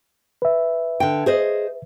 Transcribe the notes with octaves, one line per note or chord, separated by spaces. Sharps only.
B4 E5
D3 G5
G#4 C5 D#5